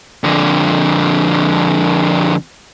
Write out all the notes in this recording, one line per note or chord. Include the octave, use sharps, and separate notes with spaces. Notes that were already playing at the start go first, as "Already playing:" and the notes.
F2 D3